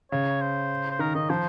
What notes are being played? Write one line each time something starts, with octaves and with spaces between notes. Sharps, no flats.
C#3 C#5
C5
C5
D#3 A#4
D#3 D#5
F3 C5